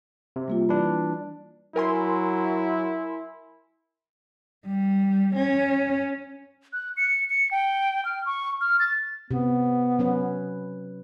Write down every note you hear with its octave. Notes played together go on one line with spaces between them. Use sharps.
C3
G3 A#3 F4
E3 D4 B5
F#3 E4 A#4 G#5 C6
G3
C#4
F#6
C#7
C#7
G5
F6
C#6
F6
A6
C3 B3
F#3 C#4 B4